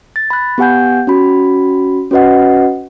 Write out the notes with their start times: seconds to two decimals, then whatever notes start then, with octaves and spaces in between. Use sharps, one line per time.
0.16 A6
0.30 B5 F#6
0.58 B3 G4 F#5 G#5 G6
1.07 C#4 F#4 B5
2.11 C#4 F#4 B4 D#5 F#5